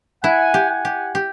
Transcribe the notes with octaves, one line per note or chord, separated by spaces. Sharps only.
E4 F#5 G#5
G4
F#5 G#5
G4
G4